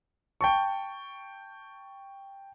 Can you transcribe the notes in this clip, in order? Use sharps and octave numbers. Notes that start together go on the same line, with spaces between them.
G5 A5 C#6